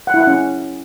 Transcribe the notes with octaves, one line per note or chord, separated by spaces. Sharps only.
F#5
E4
F#5
C#4